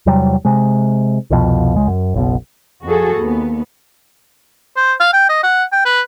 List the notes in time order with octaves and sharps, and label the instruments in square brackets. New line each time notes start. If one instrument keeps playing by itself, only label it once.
[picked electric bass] E2 C3 F#3 G3
C3 G#3
C2 F2 B2 F3
C#2 G#3
F#2
F#1 B1 B2
[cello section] F2 F#4 G#4 A4
D#2 B3
[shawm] C5
F5
G5
D#5
F#5
G5
B4